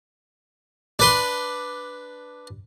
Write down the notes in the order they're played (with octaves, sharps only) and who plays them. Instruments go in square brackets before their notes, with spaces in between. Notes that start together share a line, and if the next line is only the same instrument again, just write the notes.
[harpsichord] D4 B4 C6